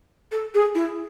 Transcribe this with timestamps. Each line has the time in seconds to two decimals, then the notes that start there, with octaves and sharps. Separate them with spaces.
0.31 A4
0.54 G#4
0.75 E4